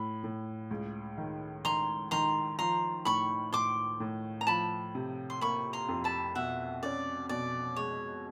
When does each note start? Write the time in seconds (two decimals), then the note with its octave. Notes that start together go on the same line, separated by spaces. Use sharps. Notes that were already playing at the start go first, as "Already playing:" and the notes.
Already playing: A2 B5
0.24 A2
0.71 C#2
1.18 D#3
1.65 D#3 A#5 C6
2.11 D#3 A#5 C6
2.59 F3 A#5 C6
3.05 A2 B5 C#6
3.53 A2 C6 D6
4.00 A2
4.41 A#5
4.47 F3 A5 B5
4.95 C3
5.30 C6
5.41 A#3 B5 C#6
5.73 A#5 C6
5.88 F2
6.04 A5 B5
6.35 B2 E5 F#5
6.83 C#4 D5
7.29 B2 D5
7.76 G#3 C#5